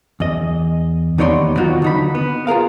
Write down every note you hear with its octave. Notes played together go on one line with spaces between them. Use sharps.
E2 D#5
D#2 B3 D#4 C#5 D5 C6
D#3 F#3 D#4 F4 F#4
D3 D#4 B5
B3
F4 G#4 A#4 F5